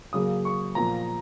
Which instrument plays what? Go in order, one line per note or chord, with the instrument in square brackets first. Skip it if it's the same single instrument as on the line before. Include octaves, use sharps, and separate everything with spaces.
[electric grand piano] C#3 F#3 A#3 D#6
C#6
A#2 F3 B3 A#5